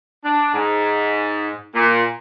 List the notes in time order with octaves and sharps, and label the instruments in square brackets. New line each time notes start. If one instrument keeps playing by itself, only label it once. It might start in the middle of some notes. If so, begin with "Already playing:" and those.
[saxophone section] D4
G#2
A#2